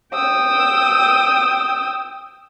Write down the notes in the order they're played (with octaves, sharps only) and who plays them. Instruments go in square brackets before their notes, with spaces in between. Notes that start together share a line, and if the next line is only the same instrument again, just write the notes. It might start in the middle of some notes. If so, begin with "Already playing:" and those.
[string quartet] G5 D#6 E6